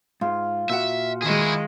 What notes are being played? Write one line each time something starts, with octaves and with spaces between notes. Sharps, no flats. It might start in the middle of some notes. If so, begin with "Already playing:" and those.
G#2 F4
A#2 F#4 E5 F#5
D#3 G#3 E4 G#4